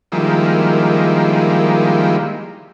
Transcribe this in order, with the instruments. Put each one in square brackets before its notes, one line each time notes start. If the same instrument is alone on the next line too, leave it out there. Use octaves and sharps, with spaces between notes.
[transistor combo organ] D#3 F3 G3 G#3 A#3 E4